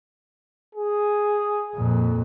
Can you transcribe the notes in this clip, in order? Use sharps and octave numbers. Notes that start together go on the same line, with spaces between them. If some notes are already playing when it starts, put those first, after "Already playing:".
G#4
F2 A#2